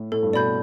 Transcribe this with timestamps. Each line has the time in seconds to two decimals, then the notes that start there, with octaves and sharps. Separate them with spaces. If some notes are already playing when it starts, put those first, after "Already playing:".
Already playing: A2
0.12 A2 A4
0.23 G2
0.33 B2 D5 B5 G6